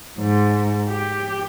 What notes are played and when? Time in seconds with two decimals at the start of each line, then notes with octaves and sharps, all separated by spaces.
0.19 G#2
0.89 G4